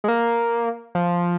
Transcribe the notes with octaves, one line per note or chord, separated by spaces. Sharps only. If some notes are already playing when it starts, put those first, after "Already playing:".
G#3
A#3
F3